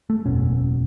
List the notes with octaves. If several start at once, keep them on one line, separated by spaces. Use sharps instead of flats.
A3
F#1 E2 B2 C#4